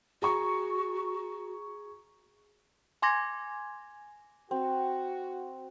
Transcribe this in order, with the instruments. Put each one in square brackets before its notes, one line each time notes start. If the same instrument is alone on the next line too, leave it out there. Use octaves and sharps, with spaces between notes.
[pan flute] F#4 [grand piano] G#4 A#5 C#6
[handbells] G#5 C6 D6 G#6 A#6
[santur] C4 [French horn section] F#4